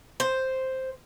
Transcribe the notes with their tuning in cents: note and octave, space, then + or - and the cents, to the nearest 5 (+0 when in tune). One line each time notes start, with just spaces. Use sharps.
C5 +0